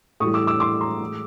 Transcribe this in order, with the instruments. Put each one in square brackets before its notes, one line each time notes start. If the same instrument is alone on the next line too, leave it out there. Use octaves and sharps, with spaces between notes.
[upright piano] A2 C#6 D#6
E3 G3
D6 E6
D6 E6
C6 D6
A#5 C6
A2 E3 G#3